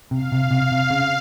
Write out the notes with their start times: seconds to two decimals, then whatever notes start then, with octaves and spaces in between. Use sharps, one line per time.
0.11 C3 F5
0.32 C3
0.51 C3
0.72 C3
0.90 C#3